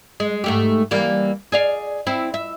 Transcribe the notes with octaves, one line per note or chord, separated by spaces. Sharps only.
G#3
G#2 A3 G4
E3 G3 A#3
G#4 D5 F5
C4 E4
E5